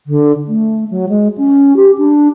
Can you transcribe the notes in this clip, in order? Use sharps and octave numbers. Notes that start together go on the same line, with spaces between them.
D3
A3
F#3
G#3
C#4
G4
D4